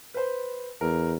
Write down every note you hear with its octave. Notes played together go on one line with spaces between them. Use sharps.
B4 C5
E2 A#4